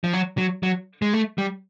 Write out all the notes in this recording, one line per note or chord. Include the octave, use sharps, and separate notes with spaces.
F3
F#3
F#3
F#3
G#3
A3
G3